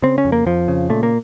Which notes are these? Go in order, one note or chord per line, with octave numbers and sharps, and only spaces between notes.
C#3 C4
C#4
F2
A#3
F2 F3
C#3
A#2 A3
A#3